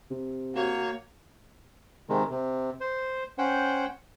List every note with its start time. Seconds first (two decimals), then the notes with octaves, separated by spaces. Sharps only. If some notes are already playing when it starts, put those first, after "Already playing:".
0.10 C3
0.55 A#3 F#4 C#5
2.09 C3 D#3 G#3
2.30 C3
2.81 C5
3.38 C#4 C5 F#5 G5